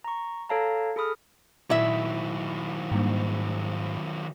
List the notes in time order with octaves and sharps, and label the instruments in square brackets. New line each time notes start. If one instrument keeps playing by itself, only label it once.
[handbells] A#5 C#6
A4 C#5 F5 A5 A#5
G#4 A4 B5 D#6 F6
[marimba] A#2 [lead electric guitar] D#3 F#3 [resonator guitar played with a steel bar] E4 E5
[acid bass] G#2 [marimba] G3 A#3 D4